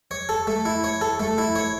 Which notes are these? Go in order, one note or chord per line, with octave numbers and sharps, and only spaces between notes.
C#5
A4
A3
E4
C#5
A4
A3
E4
C#5